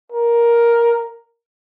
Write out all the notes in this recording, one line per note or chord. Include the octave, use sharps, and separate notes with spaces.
A#4